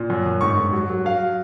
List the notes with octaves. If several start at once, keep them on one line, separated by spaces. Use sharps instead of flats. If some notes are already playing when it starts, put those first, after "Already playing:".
Already playing: A#2
F#2
F#2
G#2 C#6
G#2
F#3
F#3
F#3 F5